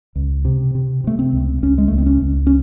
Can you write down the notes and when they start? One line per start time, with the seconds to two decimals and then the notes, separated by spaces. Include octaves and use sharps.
0.15 C#2
0.45 C3
0.75 C3
1.04 C3 A3
1.19 C4
1.33 C#2
1.62 C#2 C#4
1.78 G#3
1.88 C#2 A3
1.98 C4
2.06 C#4
2.21 C#2
2.47 C#4